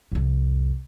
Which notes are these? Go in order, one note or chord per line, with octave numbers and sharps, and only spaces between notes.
C2 F2